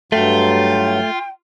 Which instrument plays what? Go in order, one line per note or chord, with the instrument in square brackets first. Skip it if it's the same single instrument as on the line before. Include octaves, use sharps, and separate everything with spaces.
[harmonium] G2 F#3 [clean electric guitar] A3 [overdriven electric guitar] F4 [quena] G5